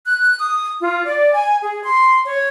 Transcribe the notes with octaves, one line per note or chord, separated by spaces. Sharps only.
F#6
D#6
F4
D5
G#5
G#4
C6
C#5